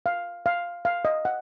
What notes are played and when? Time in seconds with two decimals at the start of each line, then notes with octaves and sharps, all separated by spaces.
0.06 F5
0.46 F5
0.85 F5
1.05 D#5
1.25 F#5